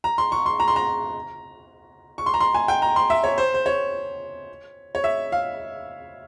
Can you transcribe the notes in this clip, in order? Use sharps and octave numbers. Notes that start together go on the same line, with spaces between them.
A#5
C6
C#6
C6
A#5
C6
A#5
C#6
C6
A#5
C6
G#5
G5
A#5
C6
E5
C#5
C5
C5
C#5
C#5
E5
F5